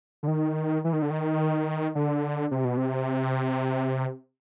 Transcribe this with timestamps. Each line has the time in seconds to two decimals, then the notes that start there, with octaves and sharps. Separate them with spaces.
0.23 D3
0.28 D#3
0.84 E3
0.93 D#3
1.02 D3
1.11 D#3
1.95 D3
2.51 C3
2.65 B2
2.77 C3